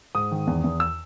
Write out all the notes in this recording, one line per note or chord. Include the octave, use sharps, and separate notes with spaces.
G#2 D#6
D#3
E2
E2
E6